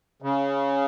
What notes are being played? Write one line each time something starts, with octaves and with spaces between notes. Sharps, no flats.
C#3